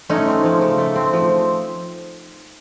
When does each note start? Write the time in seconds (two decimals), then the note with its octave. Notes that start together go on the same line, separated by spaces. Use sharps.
0.09 A3 C#4 D#4
0.27 C4
0.44 F3
0.61 C#3
0.78 A3
0.96 C4
1.13 F3